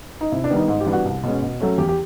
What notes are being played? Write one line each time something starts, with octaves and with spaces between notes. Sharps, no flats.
D#4
C3 E4
D4
D#3 G3 B3
D#4
G#2 D#4
G4
E3 G3 B3 D4
F#4
C2
B2 G#3 C#4
B2
F#3 A3 C#4
E2 G4
G4